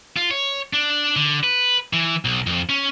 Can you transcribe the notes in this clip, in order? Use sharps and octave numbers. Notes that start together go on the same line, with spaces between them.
F4
C#5
D4
D3
B4
E3
B1
F2
C#4